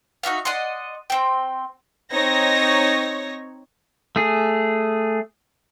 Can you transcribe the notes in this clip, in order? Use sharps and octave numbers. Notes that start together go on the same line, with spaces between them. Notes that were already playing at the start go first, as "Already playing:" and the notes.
D#4 F#4 E5 F5
D5 D#5 F#5 C6
C4 G5
C4 D#4 C#5 A#6
A3 G#4